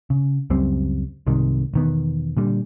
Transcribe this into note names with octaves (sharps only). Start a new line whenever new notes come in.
C#3
C#2 F#2 G3 C4
C2 G#2 C3 D#3
E1 D#3 B3
A#2 D3 G3